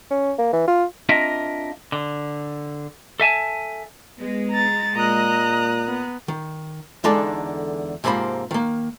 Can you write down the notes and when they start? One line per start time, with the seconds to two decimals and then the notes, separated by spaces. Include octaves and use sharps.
0.11 C#4
0.38 A#3
0.53 E3
0.67 F4
1.09 C4 D4 F4 A#4 D#5 E5
1.92 D3
3.20 A4 E5 G#5 A5
4.20 G#3 B3
4.51 A#5 A6
4.96 A#2 D#5 A#5 D#6 F#6
5.87 B3
6.28 D#3
7.04 E2 D3 G#3 D#4 A4 D5
8.04 G#2 C3 F3 A#3 C5 B5
8.51 D#3 A#3